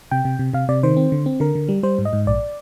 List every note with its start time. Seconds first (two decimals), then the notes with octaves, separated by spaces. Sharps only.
0.11 C3 G5
0.25 C3
0.39 C3
0.53 C3 F5
0.69 C3 D5
0.83 D#3 C5
0.97 C4
1.12 D3
1.26 C4
1.40 D3 A#4
1.55 D3
1.68 G3
1.83 G3 C5
1.98 G#2
2.05 D#5
2.13 G#2
2.27 A#1 D5